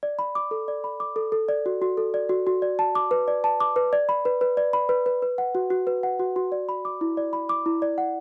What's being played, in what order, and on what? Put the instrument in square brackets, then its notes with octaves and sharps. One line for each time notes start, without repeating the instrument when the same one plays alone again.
[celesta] D5
B5
D6
A4
D5
B5
D6
A4
A4
D5
F#4
F#4
A4
D5
F#4
F#4
D5
A5
D6
B4
D5
A5
D6
B4
D5
B5
B4
B4
D5
B5
B4
B4
B4
F#5
F#4
F#4
B4
F#5
F#4
F#4
D5
B5
D6
E4
D5
B5
D6
E4
D5
F#5